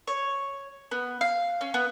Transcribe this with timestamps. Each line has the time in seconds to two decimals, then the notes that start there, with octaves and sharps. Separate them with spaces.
0.07 C#5
0.91 B3
1.21 F5
1.61 C#4
1.74 B3